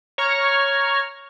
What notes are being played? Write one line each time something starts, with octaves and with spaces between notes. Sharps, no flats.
C#5 A#5 C#6 F6